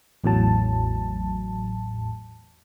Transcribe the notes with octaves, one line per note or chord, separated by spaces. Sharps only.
A1 E2 A2 F#3 A5